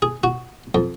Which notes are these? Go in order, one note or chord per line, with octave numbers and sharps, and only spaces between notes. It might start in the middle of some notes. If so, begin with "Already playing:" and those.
G#4
F#4
F2